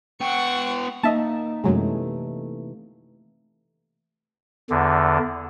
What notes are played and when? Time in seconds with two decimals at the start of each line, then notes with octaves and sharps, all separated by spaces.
0.21 B3 F#5 G5 C#6
1.03 A#3 D#4 D#5 E5 A5
1.64 F#2 C3 E3 F#3 G#3 A3
4.70 E2 D3